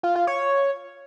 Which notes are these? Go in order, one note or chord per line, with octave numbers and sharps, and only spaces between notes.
F4
F4
C#5